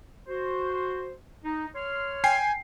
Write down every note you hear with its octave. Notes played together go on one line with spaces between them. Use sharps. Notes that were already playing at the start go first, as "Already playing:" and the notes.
F#4 C5
D#4
C#5 C6 F6
G5 G#5 C7